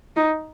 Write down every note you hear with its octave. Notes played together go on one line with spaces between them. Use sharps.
D#4